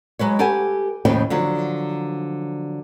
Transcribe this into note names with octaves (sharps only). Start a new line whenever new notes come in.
F#3 G#3 B4 C#5
G4 A4 B4 F#5 G#5
D#2 A2 C#3 F3 C#5 G5
D3 F3 F#3